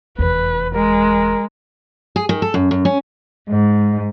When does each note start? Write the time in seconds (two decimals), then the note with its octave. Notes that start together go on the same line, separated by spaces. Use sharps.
0.18 F1 E2 B4
0.75 G#3 A#4
2.16 G#4
2.29 D#3
2.42 A4
2.54 F#2
2.71 F#2
2.85 C#4
3.50 G#2